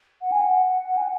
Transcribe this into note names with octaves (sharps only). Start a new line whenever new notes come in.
F#5
G#5
F#5
G#5
F#5